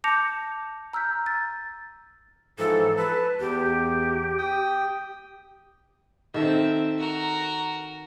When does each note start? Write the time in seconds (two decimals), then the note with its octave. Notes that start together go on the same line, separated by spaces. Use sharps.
0.04 A5 D6 G6 A#6 C#7 F7
0.93 A#5 E6 F6 G6 B6
1.26 A6
2.58 G#2 E3 F3 A4
2.97 B4 A5
3.40 E2 G4
4.38 G5 D#6
6.34 D#3 C4 A4 E5
6.99 F#4 A#4